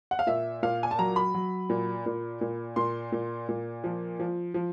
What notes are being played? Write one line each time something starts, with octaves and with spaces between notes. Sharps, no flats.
F#5
F5
A#2 E5
A#2 F5
G#5
A5
F#3 A#5
B5
F#3
A#2
A#2
A#2
A#2 C6
A#2
A#2
F3
F3
F3